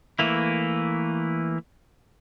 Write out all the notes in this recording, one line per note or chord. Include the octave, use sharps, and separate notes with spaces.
E3 A3 A#3 E4